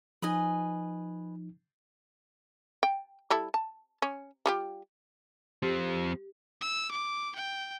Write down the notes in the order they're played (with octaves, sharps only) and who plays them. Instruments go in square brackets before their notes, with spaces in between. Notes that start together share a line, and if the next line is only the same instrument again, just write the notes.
[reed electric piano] F3 D#4 [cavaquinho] B4 D#5 G#5
[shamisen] G5
G3 E4 A4
A5
C#4
G3 F4 G4
[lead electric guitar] F3 C4 [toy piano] G4
[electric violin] E6
D6
G5